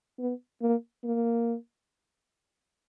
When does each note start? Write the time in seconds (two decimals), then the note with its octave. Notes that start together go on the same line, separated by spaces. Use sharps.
0.19 B3
0.61 A#3
1.04 A#3